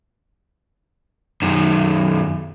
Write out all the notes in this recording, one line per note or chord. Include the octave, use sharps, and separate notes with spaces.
F#2 D#3